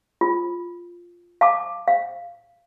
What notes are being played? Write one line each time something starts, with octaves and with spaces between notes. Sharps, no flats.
F4
F5 A5 D6
F5